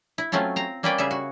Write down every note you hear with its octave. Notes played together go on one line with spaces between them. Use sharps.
E4
F#3 A3 C4 C#4 F4
C4 A#5
G3 A#3 C#4 B4 D5 G5
C#3 G3 G#4 E5
F#4